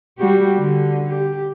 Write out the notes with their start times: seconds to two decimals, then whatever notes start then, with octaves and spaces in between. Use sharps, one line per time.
0.19 G3 F#4 G4
0.58 D3
1.08 G4